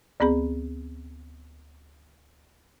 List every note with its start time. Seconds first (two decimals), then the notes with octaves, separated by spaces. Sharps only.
0.20 D2 B3 C4 G#4 B5